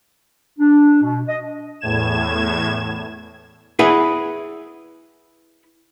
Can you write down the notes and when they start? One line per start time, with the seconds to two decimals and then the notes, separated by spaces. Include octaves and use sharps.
0.59 D4
1.03 B2
1.29 D#5
1.80 E2 A2 G#6 E7
3.79 E4 G#4 B4 F#5